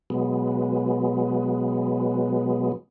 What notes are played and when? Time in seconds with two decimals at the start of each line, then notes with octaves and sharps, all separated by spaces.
0.10 B2 F#3 G#3 B3